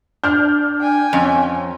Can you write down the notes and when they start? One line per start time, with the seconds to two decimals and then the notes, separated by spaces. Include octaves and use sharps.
0.24 D4 F6 G6
0.81 G5 G#5
1.13 F2 C#4